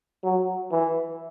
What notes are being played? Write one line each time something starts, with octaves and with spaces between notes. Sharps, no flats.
F#3
E3